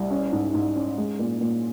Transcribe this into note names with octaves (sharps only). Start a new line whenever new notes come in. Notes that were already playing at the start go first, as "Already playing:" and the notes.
Already playing: C2 G3
C#4
G#2
G#2
C#4
G#3
A#2
A#2